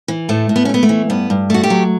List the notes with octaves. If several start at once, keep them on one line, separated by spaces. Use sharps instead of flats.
E3
A2 A3
A2
B3
C#4
A3
B3
A3
E3
G2 B3
G2
A3 F#4
G4
F#3